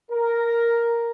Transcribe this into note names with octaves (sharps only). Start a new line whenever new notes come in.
A#4